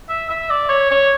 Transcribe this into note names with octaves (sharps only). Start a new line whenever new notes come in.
E5
E5
D5
C#5
C#5